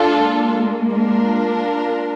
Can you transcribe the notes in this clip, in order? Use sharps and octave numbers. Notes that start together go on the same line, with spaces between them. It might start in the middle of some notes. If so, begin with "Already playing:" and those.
Already playing: D4 F4 A4
G#3 A#3
D4 F4 A#4